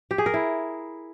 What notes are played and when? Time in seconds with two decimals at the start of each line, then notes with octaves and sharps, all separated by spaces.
0.11 G4
0.18 G#4
0.26 A#4
0.34 E4